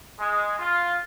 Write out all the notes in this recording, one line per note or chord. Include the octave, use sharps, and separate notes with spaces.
G#3
F4